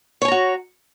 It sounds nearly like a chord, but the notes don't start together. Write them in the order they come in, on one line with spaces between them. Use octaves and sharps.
C#5 G#5 A#5 F#4